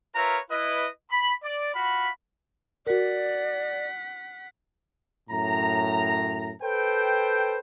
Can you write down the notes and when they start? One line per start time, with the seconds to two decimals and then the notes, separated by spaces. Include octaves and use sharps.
0.15 F4 A#4 B4 C#5 E5 A#5
0.50 E4 B4 D#5
1.11 B5
1.43 D5
1.74 F4 F#4 F5 B5
2.87 F#4 A#4 D5 F#5 B6
5.30 F#2 A2 A#5
6.62 A4 B4 C5 G5